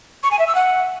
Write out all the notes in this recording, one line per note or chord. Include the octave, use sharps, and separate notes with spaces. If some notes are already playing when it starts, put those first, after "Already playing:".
C#6
G#5
E5
E6
F#5